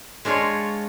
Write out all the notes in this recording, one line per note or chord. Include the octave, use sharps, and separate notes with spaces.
G#3 D4 F4 C#5